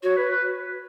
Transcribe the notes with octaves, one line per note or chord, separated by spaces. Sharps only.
F#4 C#5
B4
B4